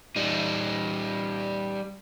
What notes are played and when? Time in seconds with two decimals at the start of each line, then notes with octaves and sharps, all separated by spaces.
0.16 G3 D#4